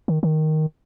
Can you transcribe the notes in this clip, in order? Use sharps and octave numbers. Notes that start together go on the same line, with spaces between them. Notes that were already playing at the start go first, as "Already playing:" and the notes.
D#3
D#3